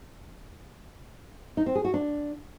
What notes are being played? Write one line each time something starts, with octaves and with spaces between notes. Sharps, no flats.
D#4
C4
G#4
F#4
D4